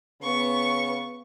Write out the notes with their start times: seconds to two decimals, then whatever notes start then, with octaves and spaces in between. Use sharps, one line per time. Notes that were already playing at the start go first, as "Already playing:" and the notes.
0.22 C#3 B3 C#6